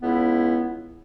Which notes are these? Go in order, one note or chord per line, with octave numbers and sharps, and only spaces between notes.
C#2 B3 E4